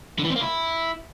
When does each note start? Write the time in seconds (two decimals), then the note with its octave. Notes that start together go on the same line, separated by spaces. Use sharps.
0.19 D3
0.25 E3
0.30 C4
0.36 A#3
0.41 E4